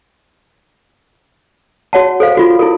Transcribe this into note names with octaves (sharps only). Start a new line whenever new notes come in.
F#4 C#5 F#5 A5
A4 C5 F5
F4 F#4 A4
E4 A4 A#4